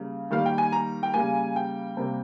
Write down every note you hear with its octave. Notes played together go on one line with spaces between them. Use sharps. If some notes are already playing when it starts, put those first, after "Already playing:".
Already playing: C#3 G3 A#3
D#3 G3 A#3 F5
G5
G#5
A#5
G5
C#3 G3 A#3 G#5
G5
C3 G3 A#3